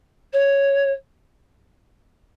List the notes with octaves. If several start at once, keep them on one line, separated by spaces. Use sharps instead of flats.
C#5